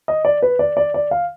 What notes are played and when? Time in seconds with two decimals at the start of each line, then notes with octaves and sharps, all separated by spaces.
0.08 D#5
0.25 D5
0.42 B4
0.59 D5
0.77 D5
0.94 D5
1.11 F5